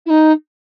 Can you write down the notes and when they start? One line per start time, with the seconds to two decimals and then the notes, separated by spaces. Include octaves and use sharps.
0.06 E4
0.10 D#4